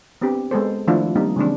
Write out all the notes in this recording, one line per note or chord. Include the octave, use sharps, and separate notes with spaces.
B3 C4 D4 G4
G#3 B3 A4 C5
D#3 F3 A3 D4 E4 F4
G3 A#3 C4 D4 D#4
C#3 E3 G#3 C4 D4